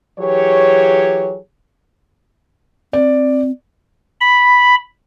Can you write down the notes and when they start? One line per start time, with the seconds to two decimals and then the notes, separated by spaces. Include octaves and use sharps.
0.19 E3 F#3 G4 G#4 C#5
2.93 C4 D5
4.21 B5